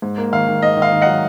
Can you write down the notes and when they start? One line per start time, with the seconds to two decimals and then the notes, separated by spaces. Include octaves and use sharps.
0.02 G#2
0.18 A#3
0.32 D#3 F5
0.48 D#3
0.62 G#2 D#5
0.77 D#3
0.82 F5
0.92 D#3
1.01 D#5 F#5
1.07 F#3